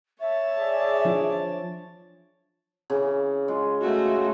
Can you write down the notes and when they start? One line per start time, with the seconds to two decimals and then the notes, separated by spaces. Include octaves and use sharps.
0.20 C#5 E5 A5
0.59 G#4 D5
1.05 F3 D4 F4
2.90 C#3 E3
3.48 G#3 F4
3.81 A3 F#4